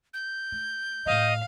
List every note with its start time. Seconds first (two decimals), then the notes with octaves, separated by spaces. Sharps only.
0.14 G6
0.52 A3
1.06 A2 D#3 D#5 F5